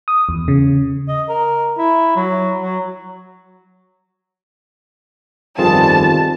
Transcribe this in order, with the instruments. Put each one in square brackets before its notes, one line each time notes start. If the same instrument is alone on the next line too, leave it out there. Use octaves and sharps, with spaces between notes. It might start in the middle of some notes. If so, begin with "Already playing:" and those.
[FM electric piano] D#6
E2
C#3
[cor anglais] D#5
A#4
E4
F#3
F#3
[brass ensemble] G1 F2 G3 [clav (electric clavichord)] D#3 [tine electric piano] C4 F4 G#4 [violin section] A5